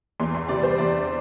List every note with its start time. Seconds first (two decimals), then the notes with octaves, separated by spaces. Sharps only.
0.20 E2 C6
0.35 C6
0.49 C3 G3 D5
0.63 C5
0.78 E2 D5